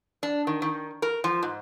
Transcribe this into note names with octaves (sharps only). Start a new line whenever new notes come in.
D4
D#3
D#3
A#4
F3
G#2